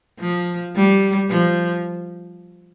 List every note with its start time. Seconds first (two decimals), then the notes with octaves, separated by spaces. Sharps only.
0.20 F3
0.76 G3
1.30 F3